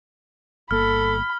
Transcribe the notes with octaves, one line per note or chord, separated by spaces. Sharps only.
G1 A#3 A4 B5 F6